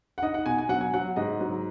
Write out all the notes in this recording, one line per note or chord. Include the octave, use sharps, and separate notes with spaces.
F#5
D#4 D#5
F#5
B2 G#5
G#5
F#3 F#5
G#5
F#3 F#5
G#2 D#5
F#3